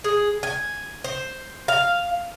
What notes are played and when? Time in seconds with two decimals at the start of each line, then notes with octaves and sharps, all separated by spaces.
0.04 G#4
0.43 G#5
1.04 C5
1.68 F5